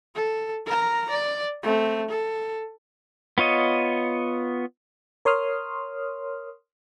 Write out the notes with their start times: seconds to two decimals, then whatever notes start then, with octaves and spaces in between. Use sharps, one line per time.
0.15 A4
0.66 A#4 A#5
1.10 D5
1.63 A3 C4
2.09 A4
3.38 B3 F4 C#5 D#5
5.25 A#4 C#5 C6 D#6 F6